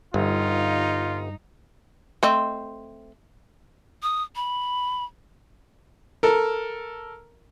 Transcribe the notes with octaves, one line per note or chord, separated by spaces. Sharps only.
G1 G2 D#4 F4
A3 C4 D#5
D#6
B5
A4 A#4